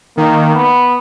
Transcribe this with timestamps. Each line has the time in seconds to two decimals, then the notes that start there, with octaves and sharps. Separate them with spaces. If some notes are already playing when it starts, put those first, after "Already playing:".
0.17 D#3 A#3
0.56 B3